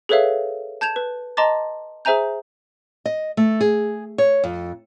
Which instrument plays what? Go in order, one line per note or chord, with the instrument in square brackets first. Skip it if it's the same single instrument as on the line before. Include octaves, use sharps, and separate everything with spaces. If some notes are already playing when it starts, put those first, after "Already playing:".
[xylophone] G#4 A4 B4 C#5 E5 F5
A5 G6 G#6 E7 F7
B4
D#5 A5 A#5 C6 D6 A6
G#4 C5 E5 G#5 A#5 G6
[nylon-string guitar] D#5
A3
G#4
C#5
F2